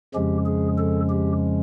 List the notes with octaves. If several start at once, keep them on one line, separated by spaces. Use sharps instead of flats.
F2 C#3 F3 G#3 C#4 G4
G#4
A4
G4